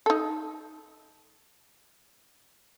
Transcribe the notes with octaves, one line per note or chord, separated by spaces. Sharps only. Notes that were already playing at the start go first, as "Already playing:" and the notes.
D#4 A4